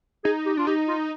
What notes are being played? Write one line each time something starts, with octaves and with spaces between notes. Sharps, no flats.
D#4 G#4
G4
D4 F4
D#4 G4
F4